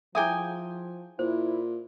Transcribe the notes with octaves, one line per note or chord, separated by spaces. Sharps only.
F3 E4 G#4 E5 G5 G#5 D#6
A#2 E4 C5